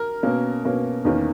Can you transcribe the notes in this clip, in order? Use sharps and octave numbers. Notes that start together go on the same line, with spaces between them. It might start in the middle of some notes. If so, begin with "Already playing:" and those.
Already playing: A#4
B2 A#3 C#4
B2 A#3 C#4
E2 D#3 A#3 C#4